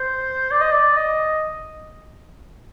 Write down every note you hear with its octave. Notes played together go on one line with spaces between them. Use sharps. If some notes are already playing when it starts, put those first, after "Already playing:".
Already playing: C5
D5
D#5
D5
D#5